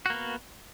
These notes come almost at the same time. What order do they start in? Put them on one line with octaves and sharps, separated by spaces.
F#4 A#3 B3